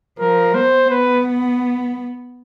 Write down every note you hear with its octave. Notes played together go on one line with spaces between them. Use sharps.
F3 A#4
B3 C5
B3 B4